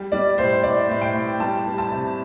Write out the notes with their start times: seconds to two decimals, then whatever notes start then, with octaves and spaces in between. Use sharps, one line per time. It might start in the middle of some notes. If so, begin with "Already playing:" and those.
Already playing: G3
0.12 G3 D5
0.38 A2 C5
0.63 A2 D5
0.89 A2
1.01 G5
1.14 A2
1.40 G3 A5
1.66 G3
1.78 A5
1.92 C3